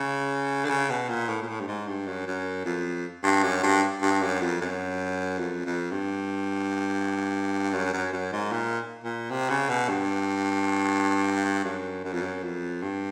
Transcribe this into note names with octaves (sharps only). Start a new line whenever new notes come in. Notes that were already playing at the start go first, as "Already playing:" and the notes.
Already playing: C#3
D3
C#3
B2
A#2
A2
A#2
A2
G2
G#2
G2
F#2
F#2
F2
G2
F#2
G2
G2
F#2
F2
F#2
F2
F2
G2
F#2
F#2
F#2
G#2
A#2
A#2
C3
C#3
B2
G2
F#2
F#2
F2
F#2
F2
G2